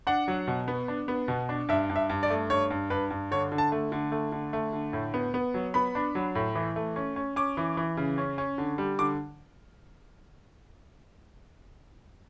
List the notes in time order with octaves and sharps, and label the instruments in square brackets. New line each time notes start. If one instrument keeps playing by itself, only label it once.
[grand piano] D4 F#5
F#3
B2
B3
D4
B3
B2
D4
G2 E5
G2
E5
G2
D5
A3
G2 C#5
G2
G2 B4
G2
D3 C#5
D3
A5
A3
D3
A3
D3
A3
D3
A2
B3
B3
F#3
B3 B5
D4
F#3
A2
E3
A3
C#4
C#4
C#4 D6
E3
E3
C#3
C#4
C#4
D3
G3
D3 D6